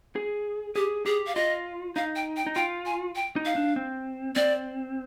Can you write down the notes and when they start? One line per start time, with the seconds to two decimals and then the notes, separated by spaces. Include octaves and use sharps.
0.16 G#4
0.76 G4 G#4
1.06 G4 G#4
1.27 F5
1.35 F4 D#5
1.96 D#4 F5
2.16 G5
2.37 G5
2.47 D#4
2.55 F4 G5
2.86 G#5
3.16 G5
3.36 D#4
3.46 F5
3.56 D4
3.76 C4
4.36 C4 D5